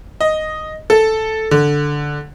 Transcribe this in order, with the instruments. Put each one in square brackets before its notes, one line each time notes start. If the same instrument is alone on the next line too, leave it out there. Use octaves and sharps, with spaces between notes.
[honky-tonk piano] D#5
A4
D3